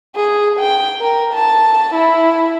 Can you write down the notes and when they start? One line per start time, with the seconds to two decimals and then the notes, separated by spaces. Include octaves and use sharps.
0.16 G#4
0.60 G5
1.00 A#4
1.34 A5
1.94 E4